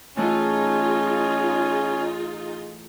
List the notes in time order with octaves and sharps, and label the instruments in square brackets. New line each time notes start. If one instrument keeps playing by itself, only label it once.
[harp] A2 E3 A3 [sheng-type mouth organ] C#4 [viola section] D#4 F4 G#4